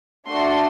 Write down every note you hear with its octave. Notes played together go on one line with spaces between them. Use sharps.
A3 D4 F#4 C6